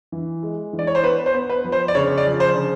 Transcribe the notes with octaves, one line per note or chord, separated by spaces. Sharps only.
E3
G#3
E3
D5
C#5
C5
B3 B4
C5
B3
B4
F3
C5
D5
C#3 C#5
D5
F3
C5
C#3